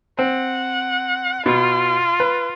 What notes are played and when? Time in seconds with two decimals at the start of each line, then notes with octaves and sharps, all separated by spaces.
0.19 C4 F#5
1.46 B2 F4
2.20 B4